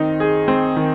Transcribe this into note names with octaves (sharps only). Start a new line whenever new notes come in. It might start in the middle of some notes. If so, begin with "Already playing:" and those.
Already playing: D#3 C4 D#4
G#4
C4
D#3